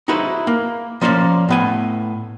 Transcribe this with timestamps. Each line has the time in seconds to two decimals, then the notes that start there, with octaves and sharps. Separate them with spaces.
0.08 D#4 E4 F#4 G#4 B4 C5
0.47 A#3
1.01 F3 A#3 C#4 C5 D5
1.49 A2 B3 G#5